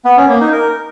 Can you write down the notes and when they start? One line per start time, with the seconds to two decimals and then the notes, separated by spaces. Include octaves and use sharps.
0.05 B3
0.17 C#4
0.29 A#3
0.40 D#4
0.52 A#4